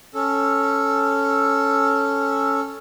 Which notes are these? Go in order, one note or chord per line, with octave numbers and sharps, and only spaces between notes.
C#4 A4